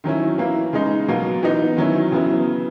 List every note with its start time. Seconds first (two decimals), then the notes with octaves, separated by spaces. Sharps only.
0.04 D#3 F#3 C#4 E4
0.38 E3 A#3 E4
0.73 C#3 G#3 D#4
1.08 B2 F#3 A#3
1.43 E3 B3 D#4
1.77 D#3 F#3 C#4 E4
2.12 C#3 F#3 B3 E4